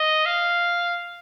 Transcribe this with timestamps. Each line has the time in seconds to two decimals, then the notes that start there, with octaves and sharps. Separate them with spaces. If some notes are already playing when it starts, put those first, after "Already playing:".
Already playing: D#5
0.26 F5